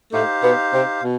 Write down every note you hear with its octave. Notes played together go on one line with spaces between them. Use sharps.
A2 A3 D#4 G4 C5 F5
B2 B3
C3 C4
B2